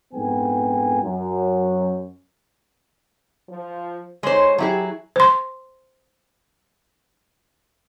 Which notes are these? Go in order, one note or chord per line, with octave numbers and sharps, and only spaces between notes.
A#1 F2 G#2 B3 G5 G#5
F#2
F3
G#3 D#4 C5 C#5
F#3 E4 G4 G#4
C5 C6